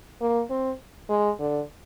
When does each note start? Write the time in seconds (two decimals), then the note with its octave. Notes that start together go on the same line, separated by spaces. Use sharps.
0.21 A#3
0.50 C4
1.09 G#3
1.40 D3